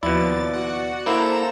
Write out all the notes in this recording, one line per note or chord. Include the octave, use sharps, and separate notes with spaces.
D#2 B2 F3 E4 D5 A6
F#4 F#5
A#3 E4 A4 C5 A#5 E7